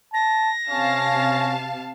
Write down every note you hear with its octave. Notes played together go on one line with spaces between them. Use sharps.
A5 A#6
C3 C#4 F5 A5